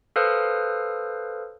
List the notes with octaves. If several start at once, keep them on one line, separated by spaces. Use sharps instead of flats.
A4 B4 C5 F5 D#6 F6